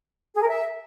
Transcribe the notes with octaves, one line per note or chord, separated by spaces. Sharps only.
G#4
A#4
E5